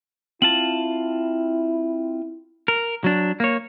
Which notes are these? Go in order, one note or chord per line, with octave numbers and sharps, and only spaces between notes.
C4 E4 F4 A5 F#7
A#4
F#3 D4
A#3 C#5